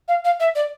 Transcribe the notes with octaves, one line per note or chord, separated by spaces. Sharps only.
F5
F5
E5
D5